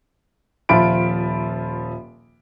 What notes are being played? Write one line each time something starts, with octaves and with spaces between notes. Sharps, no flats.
D#1 F3 F4 E5 B5 D7